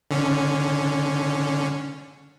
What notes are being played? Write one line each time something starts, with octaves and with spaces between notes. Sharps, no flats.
D3 C#4